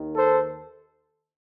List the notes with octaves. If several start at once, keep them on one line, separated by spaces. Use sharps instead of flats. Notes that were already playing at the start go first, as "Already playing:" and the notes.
Already playing: D#2 D#3
A4 C5